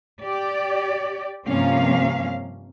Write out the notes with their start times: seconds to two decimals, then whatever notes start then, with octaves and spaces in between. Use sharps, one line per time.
0.21 G4 D5
1.48 G2 C3 F3 A#3 C#4 F5